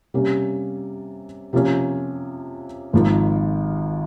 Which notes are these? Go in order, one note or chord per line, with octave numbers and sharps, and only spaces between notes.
C3 G3 A#3 C#4
C3 F3 A#3 C#4
G#1 G#2 F3 A#3